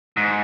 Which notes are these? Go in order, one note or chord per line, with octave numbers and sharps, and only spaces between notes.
G#2